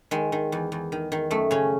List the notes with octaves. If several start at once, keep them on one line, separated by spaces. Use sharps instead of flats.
D#3 G#3
D#3
E2
E2
D#3
D#3
F#2 A3
C#3 C#4